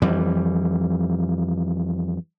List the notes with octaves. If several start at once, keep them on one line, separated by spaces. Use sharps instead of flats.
F2 E3 G3